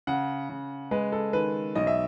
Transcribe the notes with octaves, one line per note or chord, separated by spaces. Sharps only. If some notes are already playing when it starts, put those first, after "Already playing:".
C#3 F#5
C#3
G#3 B4
A4
D#3 B4
B1 D#5
E5